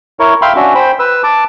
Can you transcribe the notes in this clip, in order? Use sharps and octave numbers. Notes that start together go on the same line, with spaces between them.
E4 A#4 C#5
E5 F5 G5 B5 C6
C#4 D4 F#4 E5
C5 G5 B5
B4 E6
A5 D6